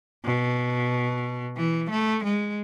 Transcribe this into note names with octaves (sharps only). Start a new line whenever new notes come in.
B2
E3
A3
G#3